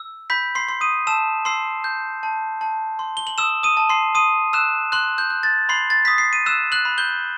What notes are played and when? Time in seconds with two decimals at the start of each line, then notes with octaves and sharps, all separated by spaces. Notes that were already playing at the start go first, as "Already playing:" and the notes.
Already playing: E6
0.30 B5 G6 B6
0.55 C6 C7
0.68 C6
0.81 D#6 D#7
1.07 A5 E6 E7
1.45 C6 E6 C7
1.84 G6
2.23 A5
2.61 A5
2.99 C6
3.17 G7
3.27 F#7
3.38 D#6 E6 E7
3.63 D#6 D#7
3.77 A5
3.90 C6 C7
4.15 C6 D#6 D#7
4.53 E6 F#6 E7
4.92 C6 F#6 F#7
5.18 G6
5.30 F#6
5.43 A6
5.69 B5 C6 C7
5.90 A6
6.05 D#6 B6
6.18 C7
6.33 D#7
6.46 E6 F#6 E7
6.72 F#6 F#7
6.85 B5
6.98 G6 G7